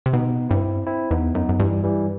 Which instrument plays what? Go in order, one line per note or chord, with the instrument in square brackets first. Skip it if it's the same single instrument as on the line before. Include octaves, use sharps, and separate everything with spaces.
[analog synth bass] C3
[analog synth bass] B2 [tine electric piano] B3 D#4
[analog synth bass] G2 [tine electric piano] C4 E4
[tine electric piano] C4 E4
[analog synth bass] E2 [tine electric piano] B3 D#4
[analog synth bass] F#2 [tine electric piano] B3 D#4
[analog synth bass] F#2
[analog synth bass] G2 [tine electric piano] E3 G3
[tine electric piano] E3 G3